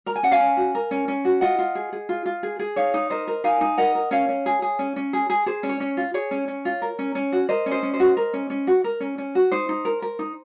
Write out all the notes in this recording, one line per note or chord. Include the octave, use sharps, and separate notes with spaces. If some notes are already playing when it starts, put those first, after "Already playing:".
A#4 A#5
G#5
C#4 F#5
F5 G#5
C#4
F#4
A#4
C#4
C#4
F#4
F4 D#5 F#5
F4
G#4
G#4
F4
F4
G#4
G#4
D#4 C#5 F5
D#4
A#4 C5 D#5
A#4
D#4 F5 G#5
D#4
A#4 D#5 F#5
A#4
C#4 C#5 F5
C#4
G#4
G#4
C#4
C#4
G#4
G#4
G#4 C5
C#4
C#5
C#4
F4
G#4 C#5
C#4
C#4
F4
A#4
C#4
C#4
F#4
A#4 C5 D#5
C#4
C5 D#5
C#4
C5 D#5
F#4
A#4
C#4
C#4
F#4
A#4
C#4
C#4
F#4
D#4 C5
D#4
A#4
A#4
D#4